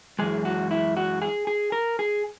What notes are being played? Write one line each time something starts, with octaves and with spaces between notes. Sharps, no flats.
F#2 E3 G#3 G#4
F#4
E4
F#4
G#4
G#4
A#4
G#4